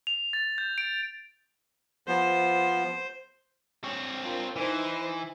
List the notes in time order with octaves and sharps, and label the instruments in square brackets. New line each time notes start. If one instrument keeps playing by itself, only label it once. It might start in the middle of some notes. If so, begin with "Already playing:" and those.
[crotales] F7
A6
G6
D7
[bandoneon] F3 B3 [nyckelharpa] C5
[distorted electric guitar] C4 C#5
[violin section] D4 F4 A#4
[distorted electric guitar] E3 [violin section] D#4 C5 D#5